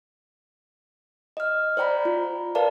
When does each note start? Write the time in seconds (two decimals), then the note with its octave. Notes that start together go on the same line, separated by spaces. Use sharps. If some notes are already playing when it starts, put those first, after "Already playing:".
1.37 D#5 F6
1.77 C5 D5 G5 A#5 B5
2.05 F4
2.55 A#4 B4 D5 F5 A5